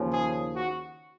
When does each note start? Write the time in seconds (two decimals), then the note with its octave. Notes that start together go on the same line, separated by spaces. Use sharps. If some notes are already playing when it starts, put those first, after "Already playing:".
Already playing: D#2 C#3 F3
0.12 G#4
0.55 F#4